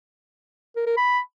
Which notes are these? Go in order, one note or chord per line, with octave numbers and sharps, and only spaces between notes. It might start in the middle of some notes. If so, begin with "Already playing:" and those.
A#4
A#4
B5